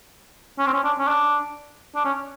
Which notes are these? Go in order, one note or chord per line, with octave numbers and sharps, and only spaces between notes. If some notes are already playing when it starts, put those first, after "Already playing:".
C#4
C4
C#4
D4
C#4
D4
D4
C#4